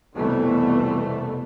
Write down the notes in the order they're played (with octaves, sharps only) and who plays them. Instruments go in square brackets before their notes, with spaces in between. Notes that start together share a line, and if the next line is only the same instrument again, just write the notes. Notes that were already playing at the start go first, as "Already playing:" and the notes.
[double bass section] C2 F2 B2 E3 A3